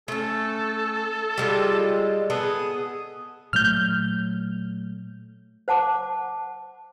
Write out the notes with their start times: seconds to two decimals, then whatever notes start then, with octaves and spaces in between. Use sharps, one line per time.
0.08 A3 C#4 A4
1.38 G3 G#3 F4
2.30 B3 G#4 A4 D#6
3.53 A#2 F#3 A3 F6 G6
5.68 C5 F#5 A5 D6